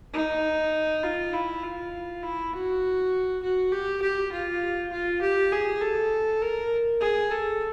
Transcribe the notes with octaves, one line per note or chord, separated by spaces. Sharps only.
D#4
F4
E4
F4
E4
F#4
F#4
G4
G4
F4
F4
G4
G#4
A4
A#4
G#4
A4